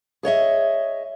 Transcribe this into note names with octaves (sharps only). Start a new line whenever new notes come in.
G#4 C#5 D#5 E5